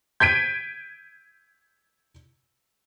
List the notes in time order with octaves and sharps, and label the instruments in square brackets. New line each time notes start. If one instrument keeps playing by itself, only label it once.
[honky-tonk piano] G6 G#6 B6 D7 D#7